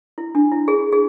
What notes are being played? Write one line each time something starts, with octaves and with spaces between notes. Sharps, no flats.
E4
D4
E4
G#4
G#4